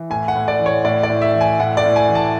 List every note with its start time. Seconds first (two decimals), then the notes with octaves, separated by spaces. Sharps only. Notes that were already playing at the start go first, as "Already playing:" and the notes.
Already playing: E3
0.10 A2 G#5
0.28 F#5
0.35 A2
0.48 D5
0.60 E3
0.66 C#5
0.84 A2 D5
1.03 D5
1.10 A2
1.21 E5
1.34 E3
1.41 G#5
1.60 A2 F#5
1.77 D5
1.84 A2
1.96 G#5
2.09 E3
2.15 A5